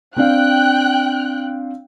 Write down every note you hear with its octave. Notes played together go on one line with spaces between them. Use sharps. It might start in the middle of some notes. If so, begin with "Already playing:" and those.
C4 D4 F5 G5 F#6